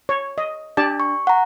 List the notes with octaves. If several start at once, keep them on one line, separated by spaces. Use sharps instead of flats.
C#5
D#5
D4 G4 D5 A5
C#6
F#5 A#5